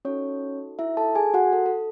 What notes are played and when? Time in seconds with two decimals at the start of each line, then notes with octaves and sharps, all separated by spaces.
0.05 C#4 D#4 F#4 A4 C#5
0.79 E4 E5
0.97 A4 A5
1.15 G#4 G#5
1.34 F#4 F#5
1.53 A4
1.66 A4